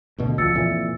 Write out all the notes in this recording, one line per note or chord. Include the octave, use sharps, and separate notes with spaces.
D2 B2 D3
C#2 F3 E6 A6 C#7
F2 A#2 E3